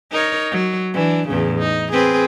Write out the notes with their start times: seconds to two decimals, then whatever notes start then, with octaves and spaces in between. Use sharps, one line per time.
0.11 D#4 A#4 C#5
0.51 F#3
0.93 E3 D4
1.28 E2 A2 C#3
1.59 D#4
1.92 C4 G#4 B4